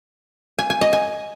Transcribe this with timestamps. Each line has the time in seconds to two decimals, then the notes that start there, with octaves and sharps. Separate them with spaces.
0.59 G#5
0.70 G#5
0.81 D#5
0.93 G#5